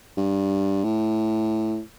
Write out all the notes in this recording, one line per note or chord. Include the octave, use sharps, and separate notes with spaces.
G2
A2